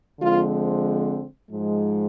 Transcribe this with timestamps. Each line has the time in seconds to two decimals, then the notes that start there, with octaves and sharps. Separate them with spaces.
0.20 D3 F3 G#3 C4 F4
1.51 G#2 F3 G#3